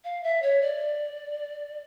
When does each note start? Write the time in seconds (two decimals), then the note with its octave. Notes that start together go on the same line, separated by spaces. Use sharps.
0.04 F5
0.23 E5
0.42 C#5
0.62 D5